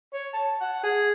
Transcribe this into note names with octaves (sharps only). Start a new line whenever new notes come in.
C#5
A5
F#5
G#4